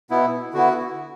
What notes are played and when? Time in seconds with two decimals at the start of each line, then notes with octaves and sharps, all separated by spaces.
0.10 B2 B3 E4
0.54 D3 B3 E4 F#4